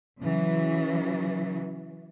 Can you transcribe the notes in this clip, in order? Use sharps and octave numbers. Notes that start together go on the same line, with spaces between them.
C#3 E3 F#3